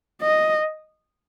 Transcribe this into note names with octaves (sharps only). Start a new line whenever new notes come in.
D#5